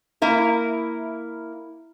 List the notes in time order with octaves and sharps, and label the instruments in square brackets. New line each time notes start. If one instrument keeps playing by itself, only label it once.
[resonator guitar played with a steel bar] A#3 E4 A#4